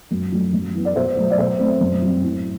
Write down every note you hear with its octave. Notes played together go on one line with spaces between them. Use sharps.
F#2
F#3 A3
F#2
E3 B3
D5
B2 C5 E5
F#3 A3
D5
B2 C5 E5
A3 C4
F#2
F#3 C4
A2